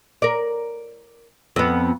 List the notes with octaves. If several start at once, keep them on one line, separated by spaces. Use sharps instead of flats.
A#4 D5
F2 B3